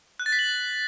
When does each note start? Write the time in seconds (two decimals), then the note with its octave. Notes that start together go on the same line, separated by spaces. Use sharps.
0.20 F#6
0.26 A6
0.32 B6
0.39 F#7